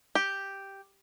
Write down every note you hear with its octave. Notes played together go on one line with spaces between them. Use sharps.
G4